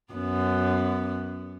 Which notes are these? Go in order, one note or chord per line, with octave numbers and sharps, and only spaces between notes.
F#2 B3